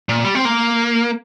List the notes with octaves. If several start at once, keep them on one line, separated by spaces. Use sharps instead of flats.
A#2
G3
C4
A#3